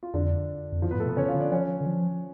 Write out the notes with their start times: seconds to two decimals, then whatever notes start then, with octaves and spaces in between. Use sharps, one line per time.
0.03 F4
0.14 F2 D3 D4
0.72 F2
0.82 F#2 F3 F4
0.91 B3 B4
0.94 G#2
1.00 A3 A4
1.06 B2
1.08 B3 B4
1.17 C#3 C#4 C#5
1.28 F4 F5
1.35 D3
1.40 D4 D5
1.52 F3 C#4 C#5
1.81 D3
1.86 F3